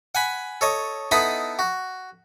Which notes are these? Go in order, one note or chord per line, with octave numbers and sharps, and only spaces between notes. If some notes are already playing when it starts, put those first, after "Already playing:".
F#5 G#5 B5
A4 C#5 D#5
B3 D#4 E4 A4 D#5 B5
F#4